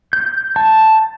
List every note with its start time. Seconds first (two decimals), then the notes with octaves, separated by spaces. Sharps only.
0.13 G6
0.56 A5